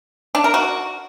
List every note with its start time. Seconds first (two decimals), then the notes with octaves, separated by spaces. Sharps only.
0.35 D4
0.44 A#4
0.54 F#4